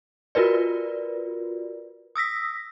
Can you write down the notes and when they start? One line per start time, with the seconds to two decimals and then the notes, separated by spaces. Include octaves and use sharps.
0.35 F4 F#4 A#4 B4 D5
2.16 D#6 E6 A#6 B6